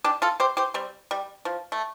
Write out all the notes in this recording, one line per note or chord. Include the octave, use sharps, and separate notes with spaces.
D4 G4
F4 A4
G4 C5
G4 C5
G3 C4
G3
F3
A3